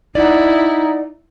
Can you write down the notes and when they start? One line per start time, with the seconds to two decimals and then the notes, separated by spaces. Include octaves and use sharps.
0.15 D#4 E4 D5 F#5